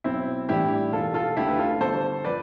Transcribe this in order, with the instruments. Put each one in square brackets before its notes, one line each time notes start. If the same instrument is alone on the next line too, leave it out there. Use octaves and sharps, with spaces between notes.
[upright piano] B1 [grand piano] C4 E4
[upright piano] A2 E3 G3 D4 [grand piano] E4 G4
[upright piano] E1 [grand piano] F4 A4
[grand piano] F4 A4
[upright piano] D2 D3 A3 [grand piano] E4 G4
[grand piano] B4
F4 A4
[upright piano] G1 [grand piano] A4 C5
[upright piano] F3 [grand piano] B4 D5